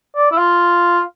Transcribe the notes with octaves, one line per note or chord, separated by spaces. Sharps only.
D5
E4
F4